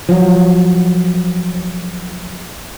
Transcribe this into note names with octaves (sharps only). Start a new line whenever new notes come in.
F3 F#3